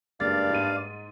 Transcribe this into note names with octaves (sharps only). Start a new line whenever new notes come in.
F#1 G2 G#3 D5 F5 A6
G#2 D#7